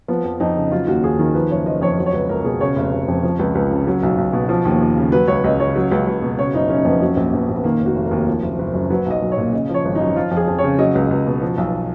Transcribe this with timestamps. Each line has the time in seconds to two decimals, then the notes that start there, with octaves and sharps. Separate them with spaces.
0.08 F3 B3
0.24 F2
0.40 F2 D#4
0.56 C#3
0.72 F#3 F4
0.87 D#2 F#4
1.04 D#2 G#4
1.19 D#3 A#4
1.34 F3 B4
1.51 F#1 C#5
1.66 F#1 D#5
1.81 F2 C#5
1.98 F#3
2.06 C#5
2.13 C#2 B4
2.29 C#2 A#4
2.39 A#4
2.44 B2 G#4
2.61 C#3 C#5
2.76 F1
2.92 F1
3.08 F2
3.23 F3
3.39 C#2
3.55 C#2
3.71 C#3
3.87 F#3
4.03 B1
4.18 B1
4.33 B2
4.49 F3
4.65 D#2
4.81 D#2
4.97 C#3
5.12 F#3 B4
5.28 C#2 C#5
5.44 C#2 D#5
5.60 C#3 C#5
5.76 F#3
5.91 C#2
6.07 C#2
6.22 B2
6.38 C#3 C#5
6.53 F#1 D#4
6.69 F#1 C#4
6.85 F2 B3
7.01 F#3 C#4
7.17 A#1
7.33 A#1 B3
7.49 A#2
7.56 B3
7.64 D#3 A#3
7.80 F1
7.86 F#4
7.96 F1
8.06 A#4
8.11 D#2
8.27 F3
8.42 F#1
8.59 F#1
8.74 F#2
8.90 F#3 B4
9.06 B1 D#5
9.22 B1
9.32 C#5
9.38 A#2
9.53 C#3 D#5
9.69 F3 C#5
9.85 G#1
9.95 F#2 D#4
10.16 F3 F4
10.31 F2
10.37 G#4
10.48 F2
10.58 C#5
10.64 C#3
10.78 F#3 D#5
10.95 C#2
11.11 C#2
11.27 B2
11.42 F3
11.58 B1